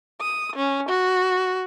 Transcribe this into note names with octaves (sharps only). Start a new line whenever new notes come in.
D#6
C#4
F#4